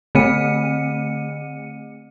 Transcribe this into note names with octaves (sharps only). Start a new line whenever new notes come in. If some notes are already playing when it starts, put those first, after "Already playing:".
D3 A3 C4 C#7 D#7